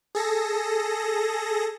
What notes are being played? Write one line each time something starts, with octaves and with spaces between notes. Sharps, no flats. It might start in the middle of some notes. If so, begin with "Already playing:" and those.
G#4 A4 A#6